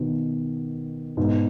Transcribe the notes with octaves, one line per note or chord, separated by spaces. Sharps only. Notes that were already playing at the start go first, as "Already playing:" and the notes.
Already playing: B2 D#3
G#2 B2